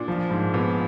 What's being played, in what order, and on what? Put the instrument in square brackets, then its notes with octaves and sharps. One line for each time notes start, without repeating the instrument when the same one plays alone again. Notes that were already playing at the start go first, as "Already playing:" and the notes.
Already playing: [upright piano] A#2 [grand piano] D4
[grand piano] F3
G#2
[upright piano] A#2 [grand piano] B3